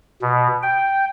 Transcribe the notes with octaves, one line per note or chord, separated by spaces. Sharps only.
B2
G5